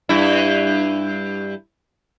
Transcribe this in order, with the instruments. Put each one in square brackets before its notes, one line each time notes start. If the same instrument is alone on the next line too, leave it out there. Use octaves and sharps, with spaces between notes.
[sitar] G2 E4